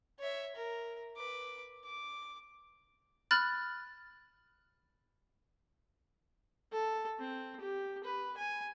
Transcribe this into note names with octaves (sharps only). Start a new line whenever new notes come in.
C#5 E5
A#4
B4 D6
D6
B5 F6 F#6 A6
A4
C4
G4
B4
G#5